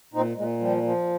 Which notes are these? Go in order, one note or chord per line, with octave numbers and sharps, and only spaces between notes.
A#2 C4 D#4
A#2 G#3
F3 G3
F3